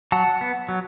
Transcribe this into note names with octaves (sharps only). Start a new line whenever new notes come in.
F#3 F#5 A5
B3
F#3